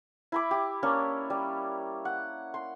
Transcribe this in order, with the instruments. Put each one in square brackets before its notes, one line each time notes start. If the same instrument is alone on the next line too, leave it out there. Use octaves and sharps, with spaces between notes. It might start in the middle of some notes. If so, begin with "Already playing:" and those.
[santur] E4 B5 D6
G4
A#3 C#4 D4 C#5
G3
F#5
C6